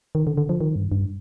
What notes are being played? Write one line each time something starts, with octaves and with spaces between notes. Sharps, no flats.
D#3
D3
D3
F3
D#3
G2
G2